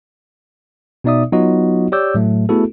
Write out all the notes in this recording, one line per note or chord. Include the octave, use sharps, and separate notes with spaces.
B2 B3 D#4 D5 E5 D#6
F#3 B3 D#4 F4 F#4 D#5
G4 C#5 D5 D6 E6 G6
A2 F#3 A3
A3 B3 E4 F#4 G#4 A4